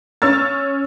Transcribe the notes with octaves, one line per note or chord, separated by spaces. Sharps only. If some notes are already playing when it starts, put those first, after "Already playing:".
C#4 C#5 E6 F6 A6